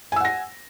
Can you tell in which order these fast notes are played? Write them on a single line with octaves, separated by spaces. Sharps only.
G#5 E6 F#5 A#6